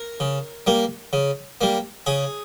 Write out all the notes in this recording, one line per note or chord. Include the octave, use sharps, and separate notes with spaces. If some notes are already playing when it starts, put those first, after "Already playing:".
Already playing: A#4
C#3
G3 A#3
C#3
G3 A#3
C#3 G#4